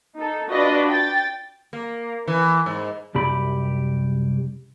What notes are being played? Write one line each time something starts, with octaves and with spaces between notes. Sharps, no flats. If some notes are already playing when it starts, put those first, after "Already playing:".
D#4 A4
D4 F4 F#4 B4 D5 D#5
G5 A6
A#3
E3
G#2
C2 F#2 G4 B5